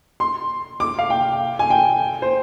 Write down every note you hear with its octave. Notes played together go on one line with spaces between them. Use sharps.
C6
D6
F5
G5
G#5
G5
C5